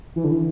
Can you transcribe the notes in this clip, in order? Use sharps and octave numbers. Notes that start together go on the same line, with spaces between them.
E3
D3
E3